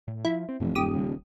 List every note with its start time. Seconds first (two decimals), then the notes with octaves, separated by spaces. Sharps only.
0.08 A2
0.25 F3 E4
0.49 C4
0.60 F1 F#2 B2 E3
0.75 D#1 F#2 G4 D#6
0.95 C#3 G3